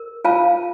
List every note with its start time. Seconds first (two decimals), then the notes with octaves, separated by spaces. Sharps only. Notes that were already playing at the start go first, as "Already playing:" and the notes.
Already playing: A#4
0.25 F4 F5 A5